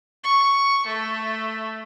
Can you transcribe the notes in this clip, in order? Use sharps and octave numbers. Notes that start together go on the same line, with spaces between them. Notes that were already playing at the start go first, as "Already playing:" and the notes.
C#6
A3